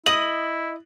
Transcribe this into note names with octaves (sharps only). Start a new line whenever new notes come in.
E4 D#5 D#6 F#7